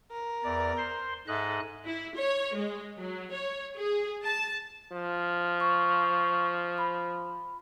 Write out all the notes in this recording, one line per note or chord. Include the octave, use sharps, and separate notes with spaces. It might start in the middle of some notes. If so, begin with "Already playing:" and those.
A#4
E2 D5
C5 C6
G#2 A4 D#5 E5 F#6
E4
C#5
G#3
F#3
C#5
G#4
A5
F3
C#6
B5